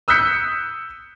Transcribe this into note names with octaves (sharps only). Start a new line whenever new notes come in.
D#6 E6 F#6 G6 B6 C#7